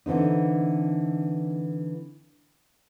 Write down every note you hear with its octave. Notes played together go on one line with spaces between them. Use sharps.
D3 E3 C4 D#4